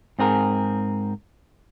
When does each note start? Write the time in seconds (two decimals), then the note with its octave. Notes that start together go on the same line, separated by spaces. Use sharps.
0.19 G#2 C4 G#4 A#4